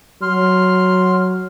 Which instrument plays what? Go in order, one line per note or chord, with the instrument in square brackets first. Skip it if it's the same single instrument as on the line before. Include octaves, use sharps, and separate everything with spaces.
[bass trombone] F#3 [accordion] C6 F6